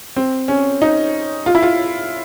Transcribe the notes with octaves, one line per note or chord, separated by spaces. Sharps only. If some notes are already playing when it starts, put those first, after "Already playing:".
C4
C#4
D#4
F4
E4
F4